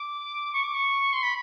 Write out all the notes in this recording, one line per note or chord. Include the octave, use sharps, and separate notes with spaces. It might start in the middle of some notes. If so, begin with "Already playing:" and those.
Already playing: D6
C#6
D6
C#6
C6
B5